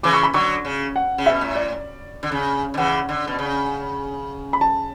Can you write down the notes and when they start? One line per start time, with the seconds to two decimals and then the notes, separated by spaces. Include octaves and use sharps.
0.03 C#3 E3 D6
0.13 C#6
0.23 B5
0.34 D3 F#3 C#6
0.65 C#3
0.96 F#5
1.18 C#3
1.26 B2 E5
1.41 A2
1.55 D5
2.23 D3
2.32 C#3
2.74 D3
2.77 C#3 E3 F#5
3.09 D3
3.27 B2
3.39 C#3
4.53 B5
4.61 A5